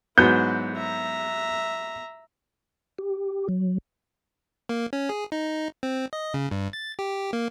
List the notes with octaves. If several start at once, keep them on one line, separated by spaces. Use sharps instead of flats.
G#2 F#3 B3 E4 G6
E5 A#5
G4
F#3
A#3
C#4
G#4
D#4
C4
D#5
C#3
G2
A6
G4
A#3